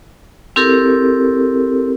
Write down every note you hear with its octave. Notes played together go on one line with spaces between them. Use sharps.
C4 E4 G4 A4 A#4